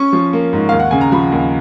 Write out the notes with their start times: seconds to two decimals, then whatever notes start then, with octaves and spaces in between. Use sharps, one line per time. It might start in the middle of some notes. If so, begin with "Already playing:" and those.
Already playing: C#4 C#6
0.13 F3
0.33 A#3
0.53 G#2
0.69 D#2 F5
0.80 F#5
0.91 C#3 G#5
1.01 A#5
1.12 F3 B5
1.32 D#2